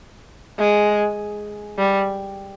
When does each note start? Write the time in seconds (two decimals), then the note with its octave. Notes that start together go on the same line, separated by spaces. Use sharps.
0.59 G#3
1.78 G3